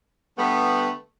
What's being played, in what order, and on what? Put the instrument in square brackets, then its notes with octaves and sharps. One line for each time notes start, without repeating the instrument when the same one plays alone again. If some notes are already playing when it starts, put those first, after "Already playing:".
[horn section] D3 G3 A3 B3